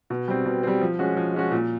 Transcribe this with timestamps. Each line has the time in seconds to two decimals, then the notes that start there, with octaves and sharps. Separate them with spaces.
0.10 B2
0.28 G3 C4
0.46 B2
0.63 G3 C4
0.81 F3
0.99 G#3 C#4 F#4
1.17 F3
1.34 G#3 C#4 F#4
1.51 A#2